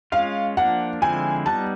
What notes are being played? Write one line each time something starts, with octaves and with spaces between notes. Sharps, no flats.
G#3 C#4 F4 F5
F3 A#3 D4 F#5
D3 F3 G#3 C4 E4 G#5
G3 B3 D#4 A5